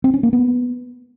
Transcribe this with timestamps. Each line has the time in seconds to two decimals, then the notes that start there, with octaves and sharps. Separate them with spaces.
0.04 C4
0.14 C#4
0.23 A#3
0.33 B3